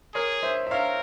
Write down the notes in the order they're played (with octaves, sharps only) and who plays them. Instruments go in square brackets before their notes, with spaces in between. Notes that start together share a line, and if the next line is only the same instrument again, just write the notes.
[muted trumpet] G#4 [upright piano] A#4 C#5
[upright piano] C5 E5
E5
[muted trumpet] A#4 [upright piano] C#5 F5